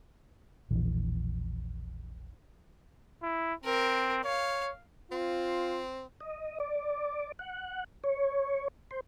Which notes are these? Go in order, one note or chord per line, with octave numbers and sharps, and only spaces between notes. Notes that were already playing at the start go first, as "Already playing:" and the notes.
E1 A#1 E3
E4
C4 A#4
C#5 F5
C4 F4
D#5
D5
F#5
C#5
C5